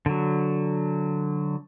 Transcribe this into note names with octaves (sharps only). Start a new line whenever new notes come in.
D3 F#3